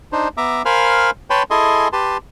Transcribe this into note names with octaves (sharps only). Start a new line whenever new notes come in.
D4 D#4 C5
B3 E5 A#5 D6
A#4 C5 F5 G#5 B5 F6
B4 C#5 G5 A5 B5 C6
E4 G#4 A4 D#5 G#5 C6
G4 B4 A5 C6